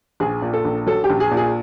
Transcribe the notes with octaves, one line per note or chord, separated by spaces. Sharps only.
A#1 G#4
A#2
A4
A#1
F#3 A4
G4
A#1
G#4
A#2
G#4